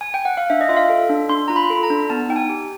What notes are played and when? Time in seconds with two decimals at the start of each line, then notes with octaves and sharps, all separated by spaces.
0.01 G#5
0.14 G5
0.25 F#5
0.37 F5
0.50 D4 E5
0.61 D#5
0.69 F4 E5
0.76 F5
0.89 A4
1.09 D4
1.29 D4 C6
1.48 F4 A#5
1.56 B5
1.70 A4
1.83 A#5
1.90 D4
2.10 B3 A5
2.29 D#4 G5
2.36 G#5
2.49 G4